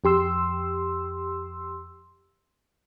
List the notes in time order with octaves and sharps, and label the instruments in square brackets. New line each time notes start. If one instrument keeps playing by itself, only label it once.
[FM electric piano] F2 G4 C6 E6